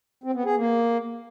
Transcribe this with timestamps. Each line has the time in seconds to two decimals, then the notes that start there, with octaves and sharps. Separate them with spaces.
0.24 C4
0.35 B3
0.45 G#4
0.56 A#3